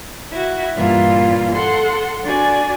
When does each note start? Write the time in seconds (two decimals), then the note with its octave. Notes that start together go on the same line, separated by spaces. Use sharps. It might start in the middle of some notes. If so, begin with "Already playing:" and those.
0.30 E4 F#4
0.76 G2 A#2 E3 F4
1.54 A4 F#5 C6
2.24 D4 F#4 D5 G#5